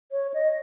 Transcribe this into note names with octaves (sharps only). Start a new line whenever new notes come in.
C#5
D#5